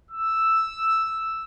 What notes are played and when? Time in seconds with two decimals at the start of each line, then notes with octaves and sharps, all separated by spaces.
0.11 E6